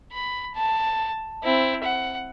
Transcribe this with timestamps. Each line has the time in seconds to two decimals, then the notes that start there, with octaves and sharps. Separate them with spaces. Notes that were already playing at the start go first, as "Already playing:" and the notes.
0.13 B5
0.55 A5
1.44 C4 E4
1.84 F#5